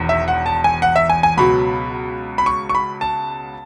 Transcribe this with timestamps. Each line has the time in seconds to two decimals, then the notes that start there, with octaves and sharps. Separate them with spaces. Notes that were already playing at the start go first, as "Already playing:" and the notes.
Already playing: E1 E2 D#3
0.09 E5
0.28 F#5
0.46 A5
0.64 G#5
0.82 F#5
0.96 E5
1.09 G#5
1.23 G#5
1.37 C#2 B2 F#3 B5
2.38 B5
2.46 C#6
2.69 C#6
2.75 B5
3.01 A5